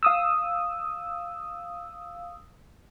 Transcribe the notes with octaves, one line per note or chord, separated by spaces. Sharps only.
F5 D#6 E6